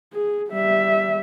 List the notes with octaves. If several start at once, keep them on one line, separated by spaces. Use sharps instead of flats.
G#4
G3 E5